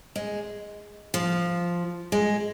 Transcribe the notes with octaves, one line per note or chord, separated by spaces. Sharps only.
G#3
F3
G#3